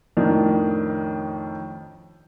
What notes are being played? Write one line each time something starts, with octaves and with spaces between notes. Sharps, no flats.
F2 A2 D#3 D4